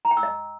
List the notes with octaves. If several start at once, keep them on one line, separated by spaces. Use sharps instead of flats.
A#5
G5
E6
D#5